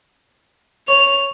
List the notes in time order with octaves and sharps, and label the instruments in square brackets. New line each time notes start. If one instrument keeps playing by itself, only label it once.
[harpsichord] C#5 [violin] F7